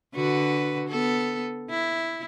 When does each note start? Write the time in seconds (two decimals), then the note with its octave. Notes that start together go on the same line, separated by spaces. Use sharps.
0.15 D3 F#4 B4
0.89 B3 A4
1.70 E4